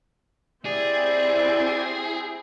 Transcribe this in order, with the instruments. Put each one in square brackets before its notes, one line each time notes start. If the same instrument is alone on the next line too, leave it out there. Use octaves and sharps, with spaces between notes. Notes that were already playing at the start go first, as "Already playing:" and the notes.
[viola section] C4 E4 G4 [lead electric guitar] G#4 [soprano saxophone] D5